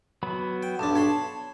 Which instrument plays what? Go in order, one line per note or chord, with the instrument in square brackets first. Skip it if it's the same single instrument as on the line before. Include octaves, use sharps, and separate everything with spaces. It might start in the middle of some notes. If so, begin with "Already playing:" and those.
[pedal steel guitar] F#3 B3 B5
[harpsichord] G5
[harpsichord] B1 G2 D4 [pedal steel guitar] A5
[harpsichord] C#5 B5 C6